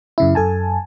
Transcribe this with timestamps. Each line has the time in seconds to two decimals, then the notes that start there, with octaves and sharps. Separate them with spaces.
0.18 F#2 C#3 E4
0.35 F#2 A4 G#5 A5